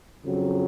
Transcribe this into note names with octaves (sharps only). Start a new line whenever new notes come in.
F2 C#3 F#3